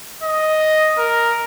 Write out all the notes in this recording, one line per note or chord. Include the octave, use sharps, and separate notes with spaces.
D#5
A#4